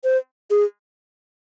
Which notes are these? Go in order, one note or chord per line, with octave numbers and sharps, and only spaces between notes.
C5
G#4